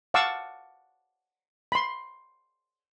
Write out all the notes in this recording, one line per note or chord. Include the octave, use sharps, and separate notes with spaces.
F5 F#5 A5 C#6 D6 E6
B5 C6